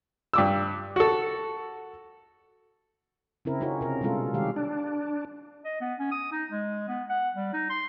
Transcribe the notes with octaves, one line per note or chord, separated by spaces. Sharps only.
G2 D6 E6
F#4 A4
C#3 C4 E4 A#4
C#4 D#4 F4 F#4 A#4
C3 A#4
B2 G3 G#3 C#4 F4 A4
D#3 G3 G#3 G4 F5
D4
D#5
B3
C#4
D#6
D#4
G#3
B3
F#5
G3
D#4
C6